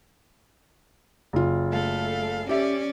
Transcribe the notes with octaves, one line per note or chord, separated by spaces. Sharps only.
F#1 F4
A3 A4 F5
C#4 G4 D5 E5